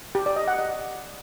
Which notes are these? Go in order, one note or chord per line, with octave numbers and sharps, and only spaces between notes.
G4
D5
D#5
F#5
D#5